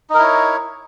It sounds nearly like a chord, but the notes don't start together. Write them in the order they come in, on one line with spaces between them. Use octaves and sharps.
D#4 A#4 E4 C#5